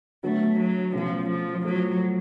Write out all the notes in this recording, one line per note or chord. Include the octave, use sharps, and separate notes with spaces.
D3 F#3 A3 B3
F#3
B2 F3 A3 C#4 F#4
F3
F3 F#3 A3 F4